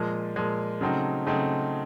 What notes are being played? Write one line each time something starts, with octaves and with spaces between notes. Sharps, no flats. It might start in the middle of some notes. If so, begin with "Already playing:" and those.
Already playing: A#2 F3 G#3
A#2 F3 G#3
C#3 F#3 A3 C4 D#4
C#3 F#3 A3 C4 D#4